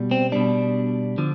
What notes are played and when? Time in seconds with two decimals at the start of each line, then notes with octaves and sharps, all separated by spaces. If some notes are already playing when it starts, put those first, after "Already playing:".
Already playing: B2 G3
0.11 C4
0.32 B2 G3 D4
1.18 D3 F3